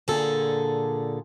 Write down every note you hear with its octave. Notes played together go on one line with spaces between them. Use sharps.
A#2 D3 G#4 A4